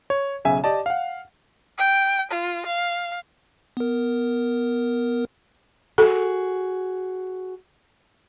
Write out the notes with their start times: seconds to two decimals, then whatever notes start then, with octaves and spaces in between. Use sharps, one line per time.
0.10 C#5
0.45 B1 C#3 E5 G#5
0.64 G4 D5 D#5 A5
0.86 F5 F#5
1.78 G5
2.31 F4
2.66 F5
3.77 B3 A#4
5.98 F#4 G#4 A4